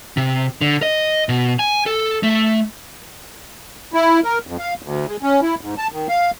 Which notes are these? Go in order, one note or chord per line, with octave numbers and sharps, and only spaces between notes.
C3
D3
D#5
B2
G#5
A4
A3
E4
A#4
F2
F5
D2
G#3
C#4
E4
G#2
A5
D#3
F5